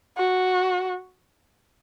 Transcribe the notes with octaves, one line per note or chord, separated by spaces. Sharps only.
F#4